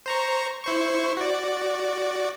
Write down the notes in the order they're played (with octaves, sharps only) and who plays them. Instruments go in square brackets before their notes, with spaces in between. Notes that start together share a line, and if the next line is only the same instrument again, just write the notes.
[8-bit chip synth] C5 A#5 C#6
E4 C5 C#6
F#4 D5